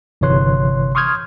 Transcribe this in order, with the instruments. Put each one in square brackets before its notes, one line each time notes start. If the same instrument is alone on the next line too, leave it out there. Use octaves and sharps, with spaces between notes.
[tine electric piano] G1 C3 E3 C#5 C6 F#6
C6 C#6 D#6 F6 G6 G#6